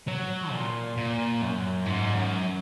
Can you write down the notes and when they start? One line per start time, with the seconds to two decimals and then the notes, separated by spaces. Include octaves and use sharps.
0.08 F#3
0.52 A#2
0.97 A#2
1.42 F#2
1.86 G#2
2.16 F#2